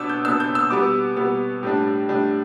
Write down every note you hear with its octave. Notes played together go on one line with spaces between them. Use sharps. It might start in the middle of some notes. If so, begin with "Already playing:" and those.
Already playing: B2 B3 D4 D6 E6
G6
B2 B3 D4 E6
G6
E6
B2 G3 B3 D6
B2 G3 B3
A2 G3 D4
A2 G3 D4